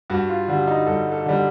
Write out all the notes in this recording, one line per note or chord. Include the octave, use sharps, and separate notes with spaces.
G2 F#4
F4
D3 G3
D#4
G2 A4
A4
D3 G3